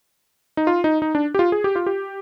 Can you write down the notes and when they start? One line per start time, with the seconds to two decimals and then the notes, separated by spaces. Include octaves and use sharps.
0.57 D#4
0.67 F4
0.84 D#4
1.02 D#4
1.15 D4
1.34 G4
1.39 F4
1.52 G#4
1.64 G4
1.76 F4
1.86 G4